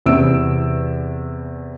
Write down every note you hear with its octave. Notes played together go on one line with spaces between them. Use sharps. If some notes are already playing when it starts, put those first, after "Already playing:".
E2 C3 E3 E6 D7